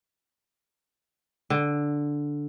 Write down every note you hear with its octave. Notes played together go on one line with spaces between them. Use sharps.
D3